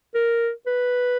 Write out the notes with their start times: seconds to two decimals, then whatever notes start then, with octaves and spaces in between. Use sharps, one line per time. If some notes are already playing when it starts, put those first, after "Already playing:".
0.15 A#4
0.67 B4